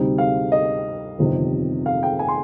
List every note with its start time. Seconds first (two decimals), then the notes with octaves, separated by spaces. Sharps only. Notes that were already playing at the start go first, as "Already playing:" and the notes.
Already playing: D2 C3 G3 C4 D#4
0.18 F5
0.52 D#5
1.19 G1 F2 C3 D#3
1.86 F5
2.03 G5
2.19 G#5
2.28 C6